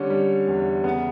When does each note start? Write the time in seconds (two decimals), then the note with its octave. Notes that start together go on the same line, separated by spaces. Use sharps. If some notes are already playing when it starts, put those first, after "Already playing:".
Already playing: D3 G3 C#4
0.10 G3
0.48 E2
0.84 C#3 B3